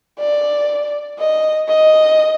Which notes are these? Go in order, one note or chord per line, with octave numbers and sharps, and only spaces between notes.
D5
D#5
D#5